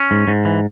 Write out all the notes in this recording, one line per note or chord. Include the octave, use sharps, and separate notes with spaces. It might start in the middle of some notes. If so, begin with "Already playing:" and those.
Already playing: C#4
G#2
G#2
E3